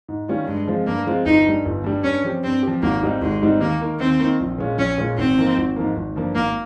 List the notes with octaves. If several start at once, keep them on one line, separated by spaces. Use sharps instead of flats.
G#2
D#3 G3 C#4 F4
G2 G#3
F3 G#3 C4 F4
G2 A#3
F3 G#3 C4 F4
G1 D#4
G2 G3
G1
G2 G3
G2 C#4
F3 C4 G4
G2 C4
F3 C4 G4
G#1 A#3
G#2 G3 C4 D#4
G#1 G#3
G#2 G3 C4 D#4
D#2 A#3
D#3 A#3
D#2 C4
D#3 A#3
A#1
A#2 G#3 C#4 F4
A#1 C#4
A#2 G#3 C#4 F4
G#1 C4
G#2 F3 A#3
G#1
G#2 F3 A#3
G#1
G2 F3 A#3
G#1 A#3